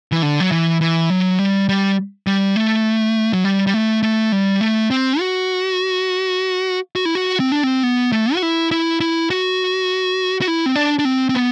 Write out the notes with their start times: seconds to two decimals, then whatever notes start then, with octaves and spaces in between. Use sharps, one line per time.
0.12 E3
0.22 D3
0.40 F#3
0.52 E3
0.81 E3
1.10 F#3
1.39 G3
1.69 G3
2.27 G3
2.56 A3
3.33 F#3
3.44 G3
3.67 G3
3.74 A3
4.03 A3
4.32 G3
4.61 A3
4.91 C4
5.20 F#4
6.96 F#4
7.05 E4
7.15 F#4
7.40 C4
7.52 D4
7.64 C4
7.83 B3
8.12 A3
8.34 F#4
8.43 E4
8.71 E4
9.00 E4
9.30 F#4
10.41 F#4
10.47 E4
10.66 C4
10.76 D4
10.99 D4
11.05 C4
11.29 C4
11.35 B3